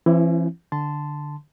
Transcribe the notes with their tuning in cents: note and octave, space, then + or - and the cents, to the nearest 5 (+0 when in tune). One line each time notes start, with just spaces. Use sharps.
E3 +40 C4 +45 E4 +0
D3 +0 A5 +0 C6 -20